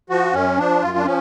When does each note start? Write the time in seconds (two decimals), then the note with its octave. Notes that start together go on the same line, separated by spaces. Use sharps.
0.10 F3 F#4
0.33 F#2 C#4
0.57 F3 D4
0.81 F#2 F4
0.97 D4
1.05 F3 C#4